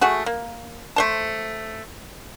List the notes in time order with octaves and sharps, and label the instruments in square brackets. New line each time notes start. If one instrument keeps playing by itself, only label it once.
[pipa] A3 F#4 G#4
A#3
A3 C5 A5